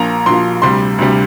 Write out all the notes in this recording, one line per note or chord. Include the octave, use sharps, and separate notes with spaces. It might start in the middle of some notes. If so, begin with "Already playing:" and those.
Already playing: A#1 A#2 F3 A#5
A#1 A#2 F3 C6
D2 C3 G3 C6
D2 C3 G3